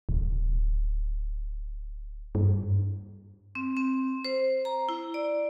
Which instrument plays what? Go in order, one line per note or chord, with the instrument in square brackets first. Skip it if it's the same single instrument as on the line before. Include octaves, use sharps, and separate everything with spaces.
[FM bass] D1
G2
[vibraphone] C4
C4
C5
A#5
E4
D5